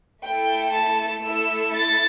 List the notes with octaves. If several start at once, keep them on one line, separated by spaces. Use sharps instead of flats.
A3 E4 A4 G5
A5
A3 E4 A4 E6
A6